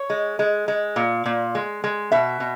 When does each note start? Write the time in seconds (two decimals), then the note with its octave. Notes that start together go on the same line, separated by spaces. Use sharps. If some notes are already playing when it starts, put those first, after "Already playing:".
Already playing: C#5
0.10 G#3
0.39 G#3
0.68 G#3
0.96 A#2
1.26 A#2
1.55 G#3
1.84 G#3
2.12 B2 E5
2.40 B2